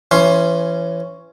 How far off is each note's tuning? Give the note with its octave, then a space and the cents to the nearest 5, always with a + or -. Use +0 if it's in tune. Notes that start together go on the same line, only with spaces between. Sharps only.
E3 +30 C#4 +0 C6 +15